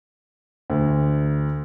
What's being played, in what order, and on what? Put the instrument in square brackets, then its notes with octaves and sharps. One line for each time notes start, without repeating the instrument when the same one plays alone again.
[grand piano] D2